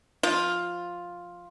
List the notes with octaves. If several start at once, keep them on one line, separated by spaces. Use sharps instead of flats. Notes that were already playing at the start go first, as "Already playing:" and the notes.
F3 F4